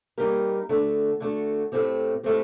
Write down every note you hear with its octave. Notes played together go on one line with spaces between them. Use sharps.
G3 A#3 D#4 G4 A#4
D3 A3 D4 F#4
D3 A3 D4 F#4
A2 A3 C4 G4
A2 A3 C4 G4